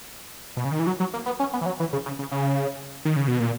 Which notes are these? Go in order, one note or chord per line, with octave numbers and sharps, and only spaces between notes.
B2
C#3
D#3
E3
F#3
F#3
A#3
B3
C#4
B3
E3
F#3
E3
C#3
C#3
C#3
C#3
D#3
C#3
B2
A#2